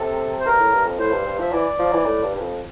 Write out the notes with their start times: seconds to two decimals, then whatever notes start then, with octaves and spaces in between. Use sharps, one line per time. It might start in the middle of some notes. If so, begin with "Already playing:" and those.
Already playing: C3 A4
0.40 C5
0.46 G2 A#4
0.59 A2
0.72 G2
0.86 F2
0.99 A2 C5
1.12 G2
1.26 G2
1.39 F3 E5
1.52 E3 D5
1.79 F3
1.93 E3
2.06 A2
2.23 G2
2.35 G2
2.41 F2